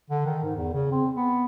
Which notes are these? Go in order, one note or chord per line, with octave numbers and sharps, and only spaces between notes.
D3
D#3
G#2
E2
C#3
C4
B3